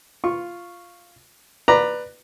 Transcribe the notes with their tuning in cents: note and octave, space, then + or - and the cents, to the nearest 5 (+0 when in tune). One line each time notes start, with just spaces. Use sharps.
F4 -5 C#6 -10
B4 +0 D5 +20 A#5 +0